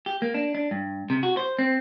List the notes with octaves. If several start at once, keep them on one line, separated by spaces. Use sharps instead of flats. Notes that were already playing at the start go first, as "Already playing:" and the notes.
G4
A#3
D4
D4
G2
C3
F#4
C5
C4